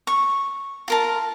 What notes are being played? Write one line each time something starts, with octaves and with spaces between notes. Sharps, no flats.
C#6
F4 A#4 A5